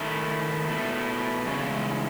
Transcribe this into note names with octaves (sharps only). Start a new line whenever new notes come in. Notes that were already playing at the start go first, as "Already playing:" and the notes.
Already playing: D#3 A3 E4
B2 A3 E4
E2 C#3 G#3 C#4 E4